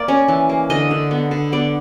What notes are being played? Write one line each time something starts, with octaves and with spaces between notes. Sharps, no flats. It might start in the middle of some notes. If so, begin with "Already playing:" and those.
Already playing: A#3 D5
C#4
E3
A#3
D3 D#5
D3
B3
D3
B3 D5